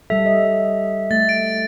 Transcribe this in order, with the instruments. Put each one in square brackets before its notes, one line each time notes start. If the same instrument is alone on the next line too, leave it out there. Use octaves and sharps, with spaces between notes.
[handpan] G3 A4 [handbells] E5
[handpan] D#5
[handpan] A3 [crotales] A6
[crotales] D7